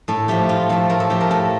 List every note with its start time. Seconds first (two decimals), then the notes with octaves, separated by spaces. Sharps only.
0.08 A2 A4
0.28 F3 A3 G4
0.49 A2 F4
0.69 F3 A3 A4
0.90 A2 A#4
1.00 A4
1.10 F3 A3 G4
1.21 A#4
1.30 A2 A4